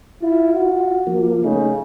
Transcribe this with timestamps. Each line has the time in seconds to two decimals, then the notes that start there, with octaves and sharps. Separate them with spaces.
0.22 E4 F4
0.54 F#4
1.07 F3 A#3
1.44 C#3 A3 D#4